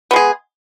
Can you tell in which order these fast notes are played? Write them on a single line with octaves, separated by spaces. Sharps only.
B3 G#3 G#4